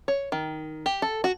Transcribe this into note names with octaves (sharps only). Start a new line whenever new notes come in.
C#5
D#3
G4
A4
F#4